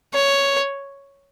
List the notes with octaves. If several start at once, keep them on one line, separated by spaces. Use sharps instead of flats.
C#5